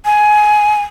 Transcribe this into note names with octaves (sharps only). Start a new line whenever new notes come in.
G#5